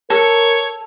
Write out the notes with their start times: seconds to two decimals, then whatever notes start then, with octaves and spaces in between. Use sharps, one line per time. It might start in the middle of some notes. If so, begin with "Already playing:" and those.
0.10 A4 A#4 C#5